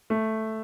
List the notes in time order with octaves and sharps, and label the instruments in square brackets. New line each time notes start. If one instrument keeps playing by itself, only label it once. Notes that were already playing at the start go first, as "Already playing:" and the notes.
[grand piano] A3